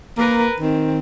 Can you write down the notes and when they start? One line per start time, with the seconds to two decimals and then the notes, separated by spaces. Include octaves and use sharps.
0.18 A#3 A#4 B4
0.60 D#3 C4